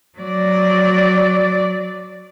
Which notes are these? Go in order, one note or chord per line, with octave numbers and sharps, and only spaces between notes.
F#3 D5